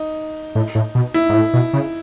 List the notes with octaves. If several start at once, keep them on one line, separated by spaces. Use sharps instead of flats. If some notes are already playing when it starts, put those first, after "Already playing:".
Already playing: D#4
A2
A2
B2
E4
G#2
A2
B2
C#3